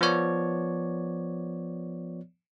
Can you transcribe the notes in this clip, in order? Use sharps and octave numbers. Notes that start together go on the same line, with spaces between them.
F3 B3 C#5 D5